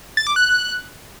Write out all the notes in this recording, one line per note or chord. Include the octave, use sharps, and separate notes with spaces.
A6
D6
F#6